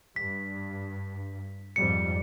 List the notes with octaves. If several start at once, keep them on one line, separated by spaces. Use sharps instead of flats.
G2 B6
F2 G#2 G3 C#7